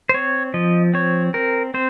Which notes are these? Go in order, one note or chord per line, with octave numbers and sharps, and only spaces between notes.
C5
C4 C#5
F3 D#5
C4 C#5
C4 A#4
C4 C5